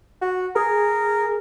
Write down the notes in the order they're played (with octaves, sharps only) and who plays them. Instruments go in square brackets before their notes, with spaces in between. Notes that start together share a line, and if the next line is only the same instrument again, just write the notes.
[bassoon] F#4
[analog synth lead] G#4 [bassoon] A#4